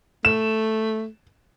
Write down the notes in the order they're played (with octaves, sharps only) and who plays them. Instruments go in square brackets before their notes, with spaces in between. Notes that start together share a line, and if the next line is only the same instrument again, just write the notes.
[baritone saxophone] A3 [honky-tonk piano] E7